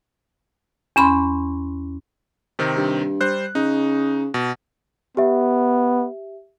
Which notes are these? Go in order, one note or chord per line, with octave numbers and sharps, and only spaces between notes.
E2 C#4 B5 C6
C3 D#3 C4
G2
G3 C5 F#6
C#3 D#4
B2
B3 G4 E5